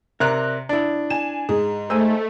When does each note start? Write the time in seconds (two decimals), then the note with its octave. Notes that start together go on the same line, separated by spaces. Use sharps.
0.20 C3 A#4 D5 A#5 F#6
0.69 D4 E4 D5
1.10 G#5 E7
1.49 G#2 G#4
1.90 A3 C5 D#5 G#5 E6